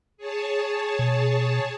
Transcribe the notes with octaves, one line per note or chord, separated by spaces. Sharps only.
G#4 C#5 A5
B2